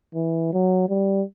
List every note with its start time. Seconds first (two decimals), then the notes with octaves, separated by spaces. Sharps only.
0.15 E3
0.53 F#3
0.89 G3